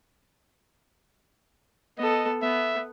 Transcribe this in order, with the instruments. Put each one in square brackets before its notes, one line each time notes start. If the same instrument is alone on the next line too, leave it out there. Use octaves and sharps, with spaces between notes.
[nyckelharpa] B3 A4 [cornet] D#5
[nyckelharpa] B3 [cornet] E5